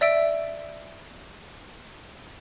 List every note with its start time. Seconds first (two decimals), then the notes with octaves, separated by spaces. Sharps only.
0.01 D5 E5 E6 D7